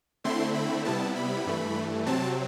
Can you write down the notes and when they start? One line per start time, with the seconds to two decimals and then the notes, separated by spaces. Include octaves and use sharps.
0.24 D3 A3 C4 E4 C6
0.54 B5
0.85 C3 G3 B3 E4 A5
1.16 B5
1.46 G2 E3 A3
2.06 C3 F#3 C4 A5